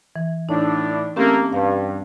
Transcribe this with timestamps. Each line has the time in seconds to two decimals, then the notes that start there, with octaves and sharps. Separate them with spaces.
0.16 E3
0.49 A2 D4 D#4
1.16 A3 A#3 C4 C#4 G4
1.53 G2 F5